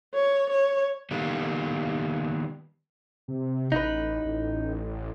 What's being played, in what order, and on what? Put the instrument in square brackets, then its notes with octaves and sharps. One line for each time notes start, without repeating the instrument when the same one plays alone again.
[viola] C#5
C#5
[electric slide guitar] D#3 G3 A#3 B3
[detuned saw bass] C3
[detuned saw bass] A1 [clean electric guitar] D#4 B4
[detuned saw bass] A1